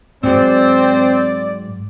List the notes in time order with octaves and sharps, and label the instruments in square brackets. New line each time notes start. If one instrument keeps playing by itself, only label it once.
[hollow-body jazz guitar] G#2 F#3 [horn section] C4 [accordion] D5